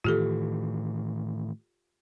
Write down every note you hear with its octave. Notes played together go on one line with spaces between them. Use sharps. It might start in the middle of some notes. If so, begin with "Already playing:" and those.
A2 D#3 E3 F4 G4 A4